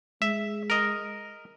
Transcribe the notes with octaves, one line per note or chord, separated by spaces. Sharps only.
G#3 E5
A#4 D#5